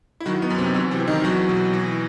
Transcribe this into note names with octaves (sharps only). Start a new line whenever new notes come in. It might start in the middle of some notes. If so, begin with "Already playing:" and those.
E4
D#3 F#3 F#4
B3
F#2
C3 C4
E3 F#3 F#4
C3 C4
E3
D#3 D#4
E2 F#3 F#4
B2
E3